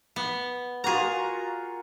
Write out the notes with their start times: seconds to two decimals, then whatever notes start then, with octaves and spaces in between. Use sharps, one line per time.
0.16 B3
0.84 F4 F#4 G#4 A#4 A#5